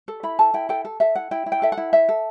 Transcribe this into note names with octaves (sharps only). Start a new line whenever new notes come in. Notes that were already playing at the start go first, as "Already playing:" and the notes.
A4
E4 B5
A4 A5
E4 G5
A4 G5
A4
A4 E5
E4 F#5
E4 G5
E4
G5
A4 E5
F#5
E4
A4 E5
A4